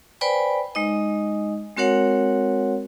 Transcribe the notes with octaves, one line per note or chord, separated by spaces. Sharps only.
B4 C5 D5 G5 G#5 B5
G#3 D#4 D#5
G#3 C4 F#4 A#4 C#5 F#5